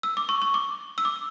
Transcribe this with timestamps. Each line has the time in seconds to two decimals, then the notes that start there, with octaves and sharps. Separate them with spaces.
0.03 E6
0.17 D6
0.29 C#6
0.42 C#6
0.54 D6
0.98 E6
1.05 D6